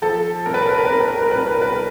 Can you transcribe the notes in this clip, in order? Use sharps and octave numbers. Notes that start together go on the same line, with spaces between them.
F3 A4
C2 A#4
B4
A#4
B4
A#4
B4
C2 A#4
B4
A#4
B4
A#4
B4
C2 A#4
B4
A#4
B4
A#4